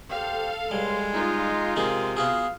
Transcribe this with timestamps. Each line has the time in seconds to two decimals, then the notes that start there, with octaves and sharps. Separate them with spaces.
0.10 G4 A4 C5 F5
0.71 C#2 G3 G#3 C6
1.13 D#4 F4
1.76 C3 G#3 A#3 G#4
2.17 B3 F#4 G#4 F5